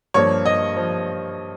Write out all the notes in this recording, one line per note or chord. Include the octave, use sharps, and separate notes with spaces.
G2 F3 A#3 C#5
D#5
F3